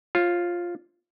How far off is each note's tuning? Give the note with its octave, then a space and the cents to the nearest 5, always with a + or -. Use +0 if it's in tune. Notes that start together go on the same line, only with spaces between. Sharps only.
F4 +0 C#5 -40